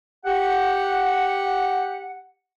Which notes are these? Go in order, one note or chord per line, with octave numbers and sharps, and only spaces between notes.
G4 F#5